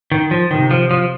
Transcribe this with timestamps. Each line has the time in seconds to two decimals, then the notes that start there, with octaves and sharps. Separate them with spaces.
0.12 D#3
0.31 F3
0.50 C3 D#3
0.71 F3
0.91 F3